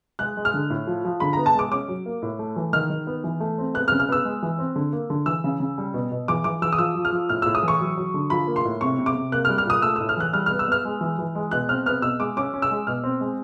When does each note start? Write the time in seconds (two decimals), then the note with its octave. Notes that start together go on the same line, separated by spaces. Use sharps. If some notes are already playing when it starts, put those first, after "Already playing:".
0.19 G#3 F#6
0.37 G#3
0.45 F6
0.54 D3
0.70 A2
0.87 F3
1.05 F3
1.20 D3 B5
1.33 B3 A#5
1.46 A5
1.55 G#3 D6
1.72 C#4 D6
1.88 F#3
2.06 A#3
2.22 A2
2.39 A3
2.56 E3
2.73 D#3 F6
2.90 D#3
3.07 B3
3.24 E3
3.40 A3
3.58 C4
3.74 B3 F#6
3.88 F6
3.92 C#3
4.00 F6
4.09 B3 E6
4.25 G#3
4.43 E3
4.58 C4
4.76 D3
4.93 A#3
5.10 D3
5.26 E3 E6
5.44 C#3
5.60 C#3
5.78 G3
5.94 B2
6.12 B2
6.28 E3 D6
6.44 E3 D6
6.62 E3 E6
6.72 D#6
6.78 F3 E6
6.95 F3
7.05 F6
7.12 F3
7.29 A2 F6
7.42 A2 E6
7.55 D#6
7.63 E3
7.68 C#6
7.80 F#3
7.97 F#3
8.14 D3
8.30 F3 B5
8.47 A#3
8.56 C6
8.65 A2
8.81 C3 C#6
8.99 C3
9.06 D6
9.15 C3
9.32 A#3 F#6
9.45 G3 F6
9.58 F6
9.65 A#2 D#6
9.82 A3 E6
9.96 A2 E6
10.09 F6
10.17 E3 F#6
10.33 G3 F6
10.46 B3 F6
10.59 E6
10.68 B3 F6
10.85 G#3
11.01 E3
11.19 E3
11.35 G#3
11.51 B2 F#6
11.69 C4 F6
11.86 B3 F6
12.02 B2 E6
12.20 G#3 D6
12.37 C#4 D6
12.54 C#4
12.62 E6
12.71 G#3
12.87 B2 F6
13.04 C4
13.21 G#3